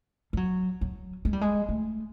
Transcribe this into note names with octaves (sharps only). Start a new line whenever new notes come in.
G3
F#3
F#3
G#3
G3
G#3
A3